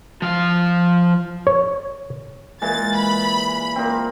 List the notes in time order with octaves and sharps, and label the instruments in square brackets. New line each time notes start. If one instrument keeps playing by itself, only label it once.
[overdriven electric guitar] F3 F5
[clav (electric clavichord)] C#5
[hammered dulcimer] A#2 E3 G#3 [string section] A6
[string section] B5
[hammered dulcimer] A#2 C4